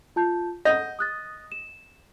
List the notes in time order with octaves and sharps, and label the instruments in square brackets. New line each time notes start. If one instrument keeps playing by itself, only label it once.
[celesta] F4 A5 G6
[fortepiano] D#5 [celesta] F#5 G6
[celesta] D#6 F#6 A6
E7